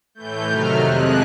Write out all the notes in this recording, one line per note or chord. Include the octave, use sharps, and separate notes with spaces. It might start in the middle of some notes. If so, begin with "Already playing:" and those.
A2 E3 A3 G6
C3 D#3 F#3 A3 F6
F2 C3 F3 G#3 F#6